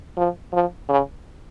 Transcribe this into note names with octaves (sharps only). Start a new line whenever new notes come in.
F3
F3
C#3